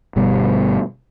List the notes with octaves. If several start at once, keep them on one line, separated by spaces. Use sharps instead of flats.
G1 B2 G3